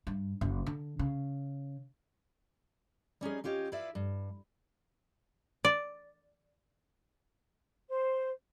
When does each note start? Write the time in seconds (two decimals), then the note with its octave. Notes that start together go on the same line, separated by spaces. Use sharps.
0.07 G2
0.41 F#1
0.66 D3
0.99 C#3
3.21 G3 C#4 D#4 G#4
3.44 C#4 F4 G4 C#5 D#5
3.72 E4 F4 B4 D5 E5
3.95 G2
5.65 D5
7.89 C5